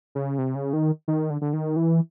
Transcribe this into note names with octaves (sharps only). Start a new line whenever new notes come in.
C#3
C3
C#3
D#3
D#3
D3
D3
D#3
E3